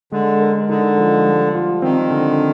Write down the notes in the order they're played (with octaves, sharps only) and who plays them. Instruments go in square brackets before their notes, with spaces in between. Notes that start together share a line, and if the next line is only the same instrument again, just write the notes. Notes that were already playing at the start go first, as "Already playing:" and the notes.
[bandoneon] D3 [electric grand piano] G#3
[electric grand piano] A#4
[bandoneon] D3 [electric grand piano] D#4
[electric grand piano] F3
G3
F4
[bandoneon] D#3 [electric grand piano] C4
[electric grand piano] D3